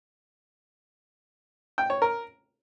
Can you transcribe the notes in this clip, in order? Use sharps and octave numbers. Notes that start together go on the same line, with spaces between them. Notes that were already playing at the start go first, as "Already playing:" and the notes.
G5
C#5
A#4